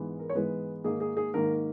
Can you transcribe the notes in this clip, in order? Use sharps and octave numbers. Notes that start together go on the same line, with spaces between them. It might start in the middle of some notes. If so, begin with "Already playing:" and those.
Already playing: G#2 E3 G#3 B3
A#4
C#5
G#2 E3 G#3 B3 B4
G#2 D#3 A#3 G#4
G#4
G#4
G#2 D#3 A#3 A#4